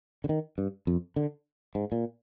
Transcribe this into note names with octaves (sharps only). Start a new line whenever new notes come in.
D3
D#3
G2
F2
D3
G#2
A#2